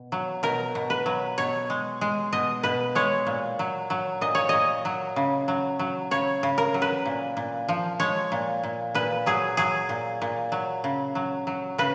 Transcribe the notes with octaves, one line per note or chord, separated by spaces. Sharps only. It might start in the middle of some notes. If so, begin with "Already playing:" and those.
Already playing: B2
F#3
B2 A#4
B2
B4
F#3
B2 C#5
G#3
G#3
B2 D#5
B2 B4
G#3 C#5
A#2
F#3
F#3
A#2 D#5
C#5
A#2 D#5
F#3
C#3
F#3
F#3
C#3 C#5
C#3
A#4
F#3
B4
A#2
A#2
F3
G#3 C#5
A#2
A#2
A#2 B4
F#3 G#4
F#3 G#4
A#2
A#2
F#3
C#3
F#3
F#3
C#3 B4